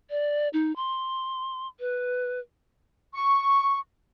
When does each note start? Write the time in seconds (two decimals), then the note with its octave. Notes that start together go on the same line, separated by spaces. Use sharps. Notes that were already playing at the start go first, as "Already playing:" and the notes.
0.10 D5
0.53 D#4
0.76 C6
1.80 B4
3.14 C#6